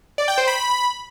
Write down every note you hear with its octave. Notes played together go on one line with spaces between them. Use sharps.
D5
G5
C5
B5